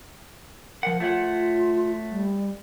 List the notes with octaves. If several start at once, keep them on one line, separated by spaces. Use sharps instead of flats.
F3 A#4 F#5
A3 F4 C#5 F#5
G3